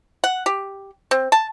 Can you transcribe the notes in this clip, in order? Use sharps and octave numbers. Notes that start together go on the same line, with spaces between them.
F#5
G4
C4
A5